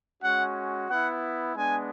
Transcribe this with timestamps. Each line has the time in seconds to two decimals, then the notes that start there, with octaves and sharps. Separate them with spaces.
0.22 G#3 C#4 F#4 F#5
0.89 B3 E4 F#5
1.56 G#3 B3 D4 G#5